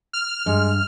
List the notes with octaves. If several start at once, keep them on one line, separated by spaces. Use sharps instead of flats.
F6
G2 G#3